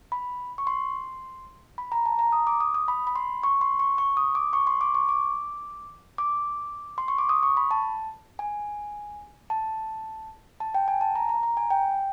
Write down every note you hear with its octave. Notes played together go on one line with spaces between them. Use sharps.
B5
C#6
C6
B5
A#5
A5
A#5
D#6
D6
D#6
D#6
B5
B5
C6
C#6
C6
C#6
C#6
D#6
D6
C#6
C6
D6
C#6
D6
D6
C6
C#6
D6
D#6
C#6
B5
A5
G#5
A5
A5
G5
G#5
A5
A#5
A#5
A#5
G#5
G5